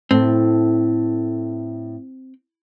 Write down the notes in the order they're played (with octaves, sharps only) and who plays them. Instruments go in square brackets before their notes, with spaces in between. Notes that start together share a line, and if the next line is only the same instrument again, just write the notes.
[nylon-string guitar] A2 A3 [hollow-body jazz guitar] C4